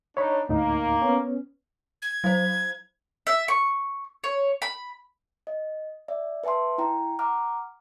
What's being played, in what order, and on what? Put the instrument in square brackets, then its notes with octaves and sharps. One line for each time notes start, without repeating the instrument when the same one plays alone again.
[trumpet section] D4 D#4 [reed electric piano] C#5 B5
[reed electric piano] D2 A2 D#4 [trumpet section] A#3
[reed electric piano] B3 C#4
[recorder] G#6
[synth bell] F#3 C5
[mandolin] E5
C#6
C#5
B5
[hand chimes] D#5
D5 E5
B4 E5 G#5 A5 C6
E4 G5 A#5
F#5 A#5 D6 F6